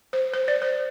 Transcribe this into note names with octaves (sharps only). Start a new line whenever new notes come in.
C5
C5
D5
C5